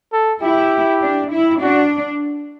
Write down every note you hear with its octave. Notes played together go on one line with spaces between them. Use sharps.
A4
E4 G4
D4
E4
D4 F#4